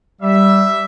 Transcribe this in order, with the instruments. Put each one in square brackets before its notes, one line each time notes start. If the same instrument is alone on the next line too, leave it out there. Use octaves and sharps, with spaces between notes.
[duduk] G3 [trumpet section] E5